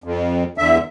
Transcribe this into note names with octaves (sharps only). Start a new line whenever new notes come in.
F2
E2 D3 E5